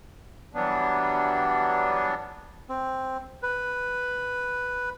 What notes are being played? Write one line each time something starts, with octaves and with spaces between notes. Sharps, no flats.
E3 F#3 G3 B3 D4
C4
B4